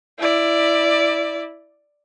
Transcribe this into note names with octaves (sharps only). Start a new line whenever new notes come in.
E4 D5